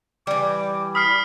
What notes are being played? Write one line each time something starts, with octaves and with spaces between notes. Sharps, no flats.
E3 G3 D6
B5 D#6 F6 C7